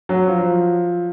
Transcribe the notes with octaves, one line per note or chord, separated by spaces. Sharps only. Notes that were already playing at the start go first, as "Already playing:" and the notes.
F#3
F3